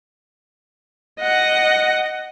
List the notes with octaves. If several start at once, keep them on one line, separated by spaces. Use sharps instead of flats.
D#5 F#5